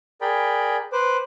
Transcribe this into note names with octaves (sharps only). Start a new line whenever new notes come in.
G#4 A#4 D5 G5 B5
B4 C5 D6